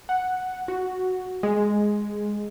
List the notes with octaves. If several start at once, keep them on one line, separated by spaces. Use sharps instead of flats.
F#5
F#4
G#3